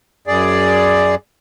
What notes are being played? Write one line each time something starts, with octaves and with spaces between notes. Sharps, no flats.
F#2 G#4 D5